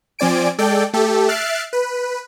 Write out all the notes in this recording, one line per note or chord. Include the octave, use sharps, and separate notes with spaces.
F3 C4 D5 G#5 D7
G#3 A4 D5 G5
A3 G4 A4
E5 F6 F#6 A6 C7 D7
B4